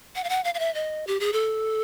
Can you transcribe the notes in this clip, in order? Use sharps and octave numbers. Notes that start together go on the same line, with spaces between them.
F#5
F5
F#5
F5
F5
E5
D#5
G4
G#4
A4